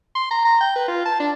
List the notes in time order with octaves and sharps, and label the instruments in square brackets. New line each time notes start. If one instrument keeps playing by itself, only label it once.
[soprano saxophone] C6
A#5
A#5
G5
B4
F4
A5
D4